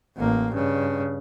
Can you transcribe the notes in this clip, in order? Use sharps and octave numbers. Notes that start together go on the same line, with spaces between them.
A1 A#3
G2 C#3